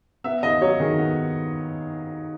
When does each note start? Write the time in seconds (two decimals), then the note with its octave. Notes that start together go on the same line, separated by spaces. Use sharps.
0.24 B3 E5
0.43 D#2 D#5
0.61 F#3 C#5
0.80 D#3 G#4
0.98 B3